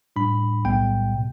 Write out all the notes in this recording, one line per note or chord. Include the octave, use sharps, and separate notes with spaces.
A2 G3 D4 B5
B1 A2 G3 B3 G5
B2